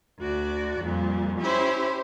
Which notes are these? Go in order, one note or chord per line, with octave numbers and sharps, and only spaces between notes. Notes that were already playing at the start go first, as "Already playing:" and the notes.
D2 F#4 D5
F2 A#2 G3
C#4 E4 G4 C5